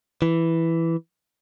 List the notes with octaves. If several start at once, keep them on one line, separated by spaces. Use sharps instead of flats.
E3